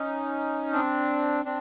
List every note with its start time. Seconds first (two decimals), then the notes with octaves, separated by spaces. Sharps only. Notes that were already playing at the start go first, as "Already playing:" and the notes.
Already playing: C#4 D#4
0.73 C4 D4
1.45 C4 D4